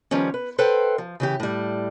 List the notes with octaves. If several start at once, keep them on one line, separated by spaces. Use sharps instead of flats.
D#3 F3 G3 B3 C#4
B4
A4 B4 C5 E5 F#5 G5
F3
C#3 E3 G4
A2 G3